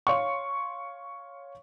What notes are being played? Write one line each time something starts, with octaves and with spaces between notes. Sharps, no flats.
C#5 F5 C6 C#6